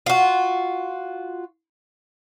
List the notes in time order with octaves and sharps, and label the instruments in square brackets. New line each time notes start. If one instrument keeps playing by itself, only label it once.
[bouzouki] F4 F#4